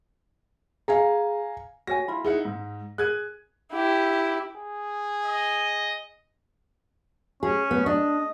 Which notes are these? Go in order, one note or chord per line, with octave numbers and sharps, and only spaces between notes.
G#4 F5 G#5 A#5
F#4 C#5 G#5 A#6
E4 F4 B5
D#4 E4 G#4 F#5
G#2
G#4 F#6 G#6 D#7
E4 G4
G#4
D#5
C#4 G#4
B3
D4 D#5